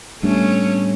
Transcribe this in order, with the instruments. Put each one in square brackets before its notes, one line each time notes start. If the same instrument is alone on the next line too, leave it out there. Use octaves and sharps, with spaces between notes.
[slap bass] A2 G3 B3 D4 [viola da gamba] A3 C#4